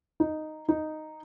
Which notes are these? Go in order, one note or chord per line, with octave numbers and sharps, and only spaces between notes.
D#4
D#4